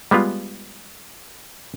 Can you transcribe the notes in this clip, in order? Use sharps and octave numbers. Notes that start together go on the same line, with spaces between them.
G3 G#3 B3 F4